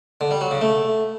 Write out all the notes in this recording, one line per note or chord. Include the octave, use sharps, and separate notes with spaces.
D3
G3
F#3
C#3
A3